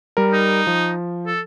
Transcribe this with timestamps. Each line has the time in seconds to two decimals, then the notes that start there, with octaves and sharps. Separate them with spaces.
0.17 G3 A#4
0.33 D#4
0.67 F3
1.26 A4